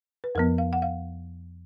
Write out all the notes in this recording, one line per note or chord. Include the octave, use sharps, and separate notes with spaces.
B4
F2 F3 B3 A#4
F5
F#5
F5